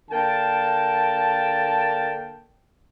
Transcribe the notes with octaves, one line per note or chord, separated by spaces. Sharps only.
D3 A#3 G5 A5